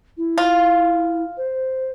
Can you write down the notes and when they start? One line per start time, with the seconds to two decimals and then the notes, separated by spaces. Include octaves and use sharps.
0.17 E4
0.38 F4
1.37 C5